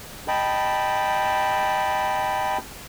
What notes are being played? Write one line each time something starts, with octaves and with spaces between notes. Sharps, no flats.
D#5 G5 A5 B5